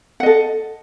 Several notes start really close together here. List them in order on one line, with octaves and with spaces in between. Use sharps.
F#5 D#5 A4